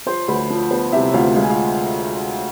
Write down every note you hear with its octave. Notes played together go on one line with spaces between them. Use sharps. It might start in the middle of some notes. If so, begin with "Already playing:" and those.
F3 C5 C6
D2 B4 B5
F3
B3 C5
C3 E4 E5
D2 F4 F5
G#3 F5
G#5
F4 F5